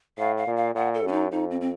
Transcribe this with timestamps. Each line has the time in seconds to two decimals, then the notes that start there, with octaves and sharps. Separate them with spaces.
0.18 A2 F5
0.37 F5
0.47 A#2
0.57 F5
0.75 A#2 F#5
0.94 A4
1.04 F#2 C#4
1.12 D#4
1.31 F2 D#4
1.51 C4
1.61 C4